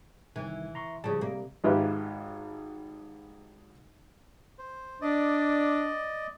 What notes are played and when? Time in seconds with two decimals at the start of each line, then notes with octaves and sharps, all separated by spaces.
0.36 C2 D#3 E3 G#5
0.75 A#5 C6 C#6
1.04 C#3 F3 G3 A5
1.21 C3 G3 A#3
1.64 G#1 G#2 F4 G4 B4 E5
4.59 C5
5.02 D4 D5 D#5